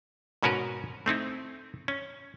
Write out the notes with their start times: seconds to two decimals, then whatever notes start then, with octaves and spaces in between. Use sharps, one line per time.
0.43 G#2 B2 C#4 F#4 A#4 B4
1.06 A3 C4 D#4 E4
1.88 C#4